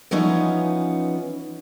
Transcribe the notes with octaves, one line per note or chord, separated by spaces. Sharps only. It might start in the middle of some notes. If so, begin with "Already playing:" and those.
E3 F3 B3 C#4 D#4